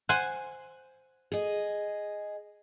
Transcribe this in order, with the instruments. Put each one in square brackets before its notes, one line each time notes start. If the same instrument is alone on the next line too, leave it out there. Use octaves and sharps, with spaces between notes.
[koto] C5 F#5 G#5
[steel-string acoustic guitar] G#4 D#5